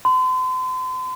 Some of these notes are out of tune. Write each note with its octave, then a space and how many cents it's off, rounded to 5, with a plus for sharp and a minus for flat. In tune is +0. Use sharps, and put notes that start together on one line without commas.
C6 -40